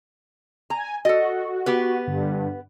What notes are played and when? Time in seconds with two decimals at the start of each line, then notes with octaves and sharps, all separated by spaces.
0.70 G#5 A#5
1.05 F#4 A4 D#5
1.66 B3 G4 B4
2.07 G2 D3